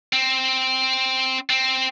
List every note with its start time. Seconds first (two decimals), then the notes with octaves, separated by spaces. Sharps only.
0.13 C4
1.50 C4